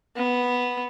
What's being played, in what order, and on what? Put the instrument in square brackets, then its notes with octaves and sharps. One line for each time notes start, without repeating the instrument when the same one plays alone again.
[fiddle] B3